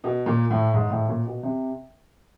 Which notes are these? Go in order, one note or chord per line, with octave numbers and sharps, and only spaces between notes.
B2
A#2
A2
G#2
A2
A#2
B2
C3